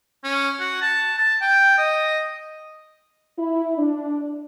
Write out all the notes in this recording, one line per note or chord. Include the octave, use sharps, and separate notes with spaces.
C#4
F#4
A5
A5
G5
D#5
E4
D4